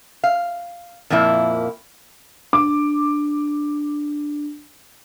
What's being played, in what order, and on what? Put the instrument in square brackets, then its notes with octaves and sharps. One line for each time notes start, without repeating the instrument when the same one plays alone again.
[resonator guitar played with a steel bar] F5
F2 A#2 F3 A#3 E4
[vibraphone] D4 [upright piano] D6